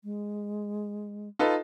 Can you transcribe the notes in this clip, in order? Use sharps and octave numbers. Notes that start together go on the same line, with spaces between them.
G#3
D#4 F4 A4 B4